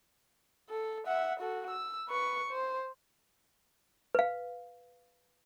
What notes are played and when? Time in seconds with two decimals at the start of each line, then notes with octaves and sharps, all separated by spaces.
0.70 A4
1.07 E5 F#5
1.40 F#4 A4
1.71 E6
2.09 B4 C#6
2.51 C5
4.15 B4 F5